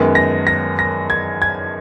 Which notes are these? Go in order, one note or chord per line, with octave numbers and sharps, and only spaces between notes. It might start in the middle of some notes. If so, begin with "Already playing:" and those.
Already playing: F#2 D#3 G#3 B3
A#6
A#6
A#6
G#6
G#6